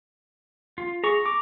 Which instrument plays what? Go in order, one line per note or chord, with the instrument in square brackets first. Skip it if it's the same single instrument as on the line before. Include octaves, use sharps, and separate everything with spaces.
[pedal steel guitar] F4
[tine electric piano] G#4 [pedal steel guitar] A#5 C#6
[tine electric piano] D6